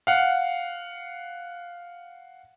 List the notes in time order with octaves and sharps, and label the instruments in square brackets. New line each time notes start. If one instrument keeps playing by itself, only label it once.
[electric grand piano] F5 F#5